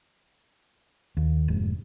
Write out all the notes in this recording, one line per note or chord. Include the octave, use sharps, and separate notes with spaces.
D#2
F1 G#2